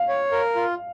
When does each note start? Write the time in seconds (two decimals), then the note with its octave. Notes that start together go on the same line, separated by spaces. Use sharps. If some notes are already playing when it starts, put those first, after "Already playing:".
Already playing: F5
0.08 C#5
0.32 A#4
0.56 F4